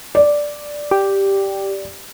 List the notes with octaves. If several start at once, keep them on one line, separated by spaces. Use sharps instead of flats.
D5
G4